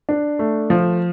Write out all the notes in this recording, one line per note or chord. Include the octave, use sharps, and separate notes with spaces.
D4
A3
F3